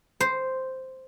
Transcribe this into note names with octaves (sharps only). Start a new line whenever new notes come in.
C5